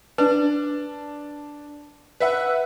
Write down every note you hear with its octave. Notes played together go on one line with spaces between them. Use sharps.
D4 B4
B4 E5 F#5